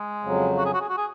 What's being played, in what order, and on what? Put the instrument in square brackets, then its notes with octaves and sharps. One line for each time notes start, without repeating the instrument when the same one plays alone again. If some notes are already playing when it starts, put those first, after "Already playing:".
Already playing: [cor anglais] G#3
[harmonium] F2 C#3 F#3
[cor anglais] F#4
G#4
F#4
G#4
F#4
G#4